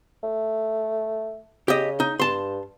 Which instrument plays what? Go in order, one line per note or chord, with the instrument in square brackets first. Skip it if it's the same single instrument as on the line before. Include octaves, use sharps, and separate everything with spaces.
[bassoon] A3
[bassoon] C#3 [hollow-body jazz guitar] G4 D#5
[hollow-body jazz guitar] D#4
[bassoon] G2 [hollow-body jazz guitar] A5 C6